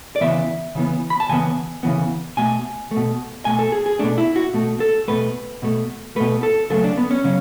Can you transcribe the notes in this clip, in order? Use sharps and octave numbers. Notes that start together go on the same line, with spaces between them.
D5
C#3 E3 B3 E5
C#3 E3 B3
B5
A5
C#3 E3 B3 G#5
C#3 E3 B3
B2 A3 G#5
A3
B2
B2 A3 G#5
A4
G#4
G#4
B2 A3 D4
E4
F#4
B2 A3
A4
B2 A3 B4
B2 A3
B2 A3 B4
A4
C#3 F#3 A3 A4
D4
B3
C#4
C#3 F#3 C#4